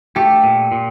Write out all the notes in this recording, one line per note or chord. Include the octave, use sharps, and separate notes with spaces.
A3 G4
A#2
A#2